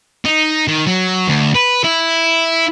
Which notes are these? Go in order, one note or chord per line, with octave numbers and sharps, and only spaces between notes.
D#4
D#3
F#3
D2
B4
E4